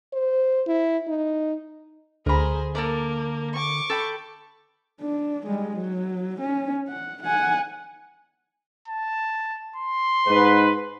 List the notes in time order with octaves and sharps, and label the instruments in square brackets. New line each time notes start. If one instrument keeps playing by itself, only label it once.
[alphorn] C5
E4
D#4
[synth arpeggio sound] D2 B5 [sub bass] D3 [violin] G#4 C5 [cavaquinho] A#4 A#5
[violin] A#3 [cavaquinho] A4 A#4 D5
[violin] C#6 D6
[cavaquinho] A4 G5 B5
[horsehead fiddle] D4
G3 G#3
F#3
C#4
F#5
F#5 G#5
[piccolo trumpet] A5
C6
[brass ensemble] G#2 B4